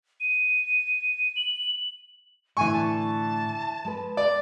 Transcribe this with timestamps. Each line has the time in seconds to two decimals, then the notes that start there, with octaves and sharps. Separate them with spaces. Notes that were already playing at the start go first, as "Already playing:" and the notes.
0.20 D#7
1.36 F#7
2.57 A2 D3 E3 G#5 C#6
2.73 A5
3.85 G#3 B4
4.17 D5